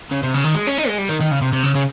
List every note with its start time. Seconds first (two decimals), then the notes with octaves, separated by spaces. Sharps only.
0.12 C#3
0.23 C3
0.34 C#3
0.44 D#3
0.55 G#3
0.67 C#4
0.78 D#4
0.88 G#3
0.98 G3
1.09 D#3
1.21 D#3
1.31 C#3
1.42 C3
1.53 C3
1.63 C#3
1.75 C#3